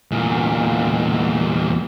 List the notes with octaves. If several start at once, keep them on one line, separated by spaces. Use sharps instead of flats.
E2 A#2